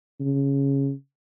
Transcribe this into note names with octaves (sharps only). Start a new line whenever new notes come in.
C#3